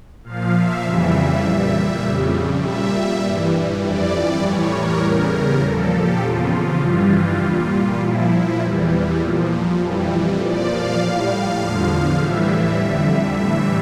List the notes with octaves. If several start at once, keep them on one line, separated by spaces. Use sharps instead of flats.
A#2 F3 F5
E5
F2 C#3 E3 G3 E5
A#2 G3
F2 C#3 G3
A#2 G3 E5
G2 E3 G3
F2 E3 G3 D5
A2 E3 G3 C#5
A#4
E2 C#3 G3
A#2 F3 A4
G4
E2 C#3 F3 F4
G2 E3 G3 F4
A#2 G3
A#2 F3 E4
E2 E3 G3
A#2 F3
F2 E3 G3
A#2 F3 D5
F5
A2 G3
E2 D3 F3
A2 E3 G3 E5
F2 D3 G3 E5
A2 E3 G3 E5